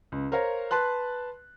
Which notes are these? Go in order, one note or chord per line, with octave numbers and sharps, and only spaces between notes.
C#2
A#4 C5 C#5 F5 A#5
B4 A5 C6 F#6